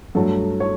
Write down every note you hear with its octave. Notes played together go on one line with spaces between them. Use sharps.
G2 F#3 A3 A4
C#5